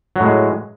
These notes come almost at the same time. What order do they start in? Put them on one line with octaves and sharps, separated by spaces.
F#3 A2 G#3